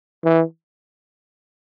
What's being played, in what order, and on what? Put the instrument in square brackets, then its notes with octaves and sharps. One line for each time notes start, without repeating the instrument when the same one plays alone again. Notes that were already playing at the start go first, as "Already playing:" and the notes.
[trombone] E3